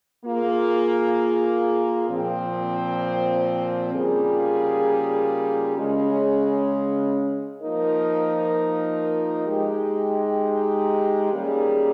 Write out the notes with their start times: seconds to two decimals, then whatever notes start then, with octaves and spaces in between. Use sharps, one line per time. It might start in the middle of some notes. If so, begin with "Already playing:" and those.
0.23 A#3 F4 G#4
2.09 A#2 F3 C4
3.93 C#3 G3 A#3 F4 G#4
5.78 C#3 G#3 C#4
7.62 F3 A#3 D#4 A#4
9.46 G#3 D#4 G4
11.32 D#3 G3 A#3 C#4 G#4